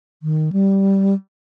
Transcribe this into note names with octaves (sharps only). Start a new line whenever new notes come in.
D#3
G3